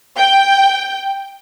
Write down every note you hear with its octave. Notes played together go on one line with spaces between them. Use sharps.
G5